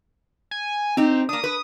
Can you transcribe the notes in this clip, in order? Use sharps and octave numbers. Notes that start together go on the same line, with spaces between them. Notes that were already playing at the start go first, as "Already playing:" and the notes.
G#5
C4 D#4 G4
A#3 D4 D#6
B4